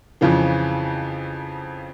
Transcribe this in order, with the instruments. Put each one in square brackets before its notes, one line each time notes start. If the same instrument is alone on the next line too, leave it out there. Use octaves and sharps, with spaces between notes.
[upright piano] F2 C#3 E3 F3